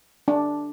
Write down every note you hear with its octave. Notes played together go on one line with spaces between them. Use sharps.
D4